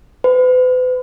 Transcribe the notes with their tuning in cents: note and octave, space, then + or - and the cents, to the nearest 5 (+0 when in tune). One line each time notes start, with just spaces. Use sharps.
B4 +40